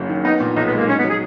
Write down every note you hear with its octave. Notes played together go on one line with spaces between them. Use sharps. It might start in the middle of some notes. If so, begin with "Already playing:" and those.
Already playing: F#1 F#2 F#3
D#3
B3 D#4
A#2
B1 D#4
B3
G#3
A#3
C#4 D#4
B3
F#3
G#4